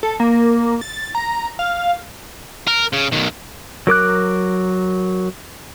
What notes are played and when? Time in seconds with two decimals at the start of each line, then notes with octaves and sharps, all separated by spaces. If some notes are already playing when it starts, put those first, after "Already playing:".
0.03 A4
0.20 A#3
0.81 A6
1.15 A#5
1.59 F5
2.67 A#4
2.93 C#3
3.12 B1 D#3
3.87 F#3 A#4 D6 F#6